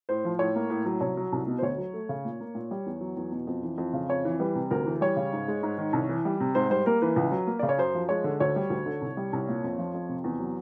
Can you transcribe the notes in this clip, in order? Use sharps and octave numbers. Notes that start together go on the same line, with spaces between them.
A2 C5
F3
A2 C#5
A#3
A2
F#3
C2 C#5
F#3
C2
B2
C5
D2 C#5
F#3
A3
C#3
A#2
A#3
A#2
G3
E2
F#3
E2
B2
F2
E3
F2
C#3
F2 C#5
E3
G3 B4
C3
D2 A#4
E3
G3 C#5
C#3
G#2
G#3
G#2
D#3
C2
E3
G3
C3
G#2 C5
G3 C5
A#3 A#4
E3 B4
C#2
F#3
A#3
C#3 D5
C#5
F#2 C5
F3
G#3 C#5
D3
D2 C#5
G3
D2
D3
C2
G3
C2
A#2
F2
F3
F2
C3
E2
F#3